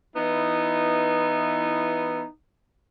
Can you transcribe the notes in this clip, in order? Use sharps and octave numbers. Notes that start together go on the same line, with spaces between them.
E3 B3 D#4 E4